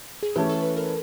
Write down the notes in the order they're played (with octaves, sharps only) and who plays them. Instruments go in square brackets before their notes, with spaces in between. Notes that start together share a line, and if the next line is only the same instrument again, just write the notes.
[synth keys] G#4
[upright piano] E3 A3 C#4 [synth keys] G4
[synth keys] A4
B4
A#4